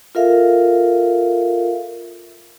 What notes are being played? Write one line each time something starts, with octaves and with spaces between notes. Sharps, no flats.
F4 A4 A#4 E5 F5